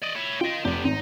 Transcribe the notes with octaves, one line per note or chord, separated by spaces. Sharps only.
D5 D#5
E4 C#5
F4 D#5 G5
F1 B3 G4
G#1 D#4